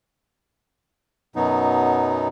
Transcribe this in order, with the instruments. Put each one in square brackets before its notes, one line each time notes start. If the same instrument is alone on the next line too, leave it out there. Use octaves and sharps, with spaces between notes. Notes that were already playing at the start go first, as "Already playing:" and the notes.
[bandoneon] F#2 B2 F#3 B3 D#4